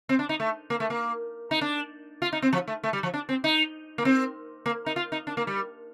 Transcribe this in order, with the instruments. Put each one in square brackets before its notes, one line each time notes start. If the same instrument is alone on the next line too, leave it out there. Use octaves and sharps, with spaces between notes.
[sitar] C4
D4
D#4
A3
A#3
A3
A#3
D#4
D4
F4
D#4
C4
F3
A3
A3
G3
F3
D4
C4
D#4
A#3
C4
A#3
D#4
F4
D#4
D4
A#3
G3